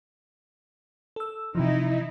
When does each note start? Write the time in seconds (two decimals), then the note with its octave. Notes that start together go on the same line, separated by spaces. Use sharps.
1.16 A4 E6
1.55 C3 E3 F3 D#4 E4